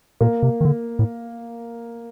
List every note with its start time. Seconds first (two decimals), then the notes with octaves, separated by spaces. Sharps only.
0.21 A#2 A#3
0.43 C3
0.61 D#3
0.65 D3
0.99 A2